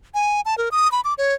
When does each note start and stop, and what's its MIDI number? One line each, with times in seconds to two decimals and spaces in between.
0.14 0.41 80
0.45 0.57 81
0.58 0.69 70
0.71 0.91 87
0.92 1.01 83
1.05 1.14 86
1.18 1.34 73